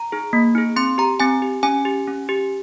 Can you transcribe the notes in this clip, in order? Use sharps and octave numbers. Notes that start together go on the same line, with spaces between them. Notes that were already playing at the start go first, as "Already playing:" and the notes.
Already playing: A#5
D#4 G#4
A#3
D#4 G#4
C4 C6
G4 A#5
C4 G#5
G4
C#4 G#5
G4
C#4
G4